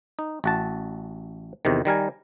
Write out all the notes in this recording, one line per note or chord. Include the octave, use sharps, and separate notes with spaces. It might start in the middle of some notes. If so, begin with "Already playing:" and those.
D#4
A1 F#4 A5
E2 C3 D#3
D#3 G3 A#4 G#5